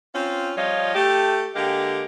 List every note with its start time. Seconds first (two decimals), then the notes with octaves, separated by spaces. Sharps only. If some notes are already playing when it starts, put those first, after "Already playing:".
0.15 C4 C#4 F4
0.56 F3 G3 F4 C#5 D#5
0.95 A3 G4
1.55 D3 G#3 A#3 G4